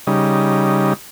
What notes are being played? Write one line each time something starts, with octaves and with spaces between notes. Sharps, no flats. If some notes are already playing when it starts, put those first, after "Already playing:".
C#3 G3 D#4